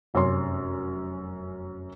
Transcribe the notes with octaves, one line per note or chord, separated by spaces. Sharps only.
F1 F#2 C#4 C#5 C6